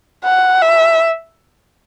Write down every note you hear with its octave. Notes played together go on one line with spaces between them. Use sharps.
F#5
E5